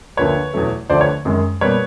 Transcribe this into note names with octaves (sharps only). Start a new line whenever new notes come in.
D2 D3 F3 A#3 B4 C#5
E2 B2 F#3 A3
D2 D3 F3 A3 C5 D5
B4 C#5
F#2 D#3 G#3
B2 G3 A#3 B4 C#5